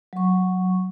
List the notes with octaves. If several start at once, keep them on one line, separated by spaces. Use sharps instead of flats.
F#3 C#6